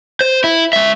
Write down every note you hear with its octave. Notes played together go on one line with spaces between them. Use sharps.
C5
E4
G#3 E5